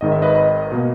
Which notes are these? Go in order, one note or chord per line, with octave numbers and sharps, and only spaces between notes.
G#1 G#2 D#3 D#5
E5
B4 D#5
B4 D#5
B2 A#3